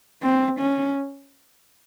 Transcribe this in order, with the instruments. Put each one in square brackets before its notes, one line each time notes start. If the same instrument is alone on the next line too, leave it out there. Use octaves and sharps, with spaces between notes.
[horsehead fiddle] C4
C#4